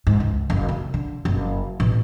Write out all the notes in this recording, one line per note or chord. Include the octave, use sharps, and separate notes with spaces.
G#2
C#2
F#1
C#3
D3
F#1
A1